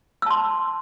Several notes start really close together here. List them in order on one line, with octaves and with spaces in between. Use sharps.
E6 A5 C6